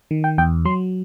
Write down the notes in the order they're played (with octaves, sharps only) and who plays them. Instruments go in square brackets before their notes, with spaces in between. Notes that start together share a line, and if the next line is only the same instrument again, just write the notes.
[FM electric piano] D#3
G5
E2 G5
F#3 C6